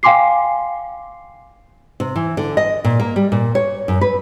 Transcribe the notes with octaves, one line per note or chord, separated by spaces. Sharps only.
F5 G5 G#5 C6 D6 C7
C3
E3
D3
D#5
A#2
A#3
G3
A#2
C#5
F#2
B4